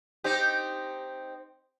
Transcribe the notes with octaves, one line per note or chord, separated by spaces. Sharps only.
C4 D#4 G4